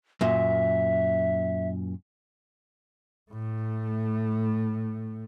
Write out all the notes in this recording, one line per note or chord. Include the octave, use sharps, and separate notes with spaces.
F#2 A#2 E5
A2 A3